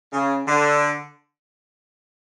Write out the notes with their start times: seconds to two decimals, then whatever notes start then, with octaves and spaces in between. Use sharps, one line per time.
0.13 C#3
0.46 D3